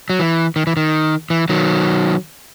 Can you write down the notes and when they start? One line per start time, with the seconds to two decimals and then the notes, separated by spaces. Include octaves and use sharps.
0.10 F#3
0.20 E3
0.56 D#3
0.67 E3
0.77 D#3
1.30 E3
1.49 D#3 F#3